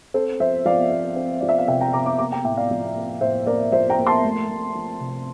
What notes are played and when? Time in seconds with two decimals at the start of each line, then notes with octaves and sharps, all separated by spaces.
0.14 C4 A4 C5
0.40 F3 C5 E5
0.65 F3 D5 F5
0.91 C4
1.16 C4
1.40 F3 D5
1.49 E5
1.59 F5
1.68 C3 E5 G5
1.81 G5 A#5
1.93 C3 A#5 D6
2.06 A#5 D6
2.18 A#3 A#5 D6
2.32 G5 A#5
2.44 A2 E5 G5
2.57 D5 F5
2.71 F3
2.95 A#3
3.21 A2 C5 E5
3.46 A#3 A#4 D5
3.72 F3 C5 E5
3.90 G5 A#5
3.98 A#3
4.07 A5 C6
4.23 A3
4.49 A3
4.75 F3
5.00 C3